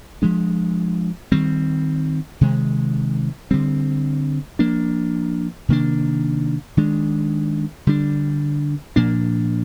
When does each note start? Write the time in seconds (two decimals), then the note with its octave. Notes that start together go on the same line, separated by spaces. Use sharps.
0.22 F3 G#3 D4
1.32 D#3 G3 C4
2.41 C3 D#3 G#3
3.51 D3 G3 C4
4.59 F3 A#3 D4
5.69 C3 D#3 A#3 D4
6.77 D#3 G#3 D4
7.87 D3 G3 D4
8.96 A#2 F3 A#3 D4